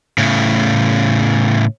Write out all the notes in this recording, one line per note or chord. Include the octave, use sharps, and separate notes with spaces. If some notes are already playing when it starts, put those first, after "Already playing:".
A2 C#3